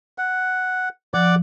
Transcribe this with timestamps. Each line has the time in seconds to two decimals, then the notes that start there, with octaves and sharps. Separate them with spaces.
0.18 F#5
1.14 F3 D5 F#5 D6